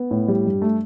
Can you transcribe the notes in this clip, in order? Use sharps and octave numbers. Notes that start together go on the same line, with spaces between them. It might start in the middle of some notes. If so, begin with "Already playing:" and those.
Already playing: B3
A2
G3
G2
A3